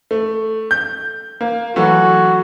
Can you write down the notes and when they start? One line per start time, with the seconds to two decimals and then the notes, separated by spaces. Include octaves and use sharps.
0.11 A3
0.71 G6
1.41 A#3
1.76 E3 F#3 A3 F#4